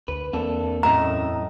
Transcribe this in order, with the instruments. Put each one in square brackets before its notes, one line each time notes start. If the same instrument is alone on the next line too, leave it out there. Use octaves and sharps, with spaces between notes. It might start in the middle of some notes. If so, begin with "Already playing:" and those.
[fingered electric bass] D2 [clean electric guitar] B4
[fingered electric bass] E2 C4 [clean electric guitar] A#3 D4 A4
[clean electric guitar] F#2 [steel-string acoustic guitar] A2 A3 D#5 [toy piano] A#5